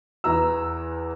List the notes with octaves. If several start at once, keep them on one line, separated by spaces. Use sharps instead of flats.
E2 E3 A#5 E6